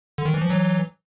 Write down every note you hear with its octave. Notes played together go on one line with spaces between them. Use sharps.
D3
D#3
E3
F3
E3 F#3